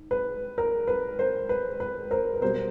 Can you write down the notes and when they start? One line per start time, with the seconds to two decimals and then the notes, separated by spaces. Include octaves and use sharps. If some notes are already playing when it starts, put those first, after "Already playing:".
Already playing: G#2
0.11 B4
0.58 A#4
0.88 B4
1.19 A#4 C5
1.49 B4
1.80 B4
2.11 A#4 C5
2.34 B4
2.41 B2 G3 B3 A#4 C5